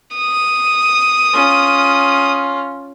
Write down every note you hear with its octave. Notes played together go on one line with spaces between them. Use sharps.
D#6
C#4 F4